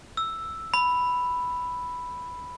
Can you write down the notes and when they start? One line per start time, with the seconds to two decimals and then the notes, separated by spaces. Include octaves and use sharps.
0.17 E6
0.74 B5